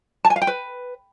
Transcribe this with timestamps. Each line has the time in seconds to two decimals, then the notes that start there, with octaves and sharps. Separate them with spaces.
0.25 A5
0.30 G#5
0.36 F5
0.42 G5
0.47 B4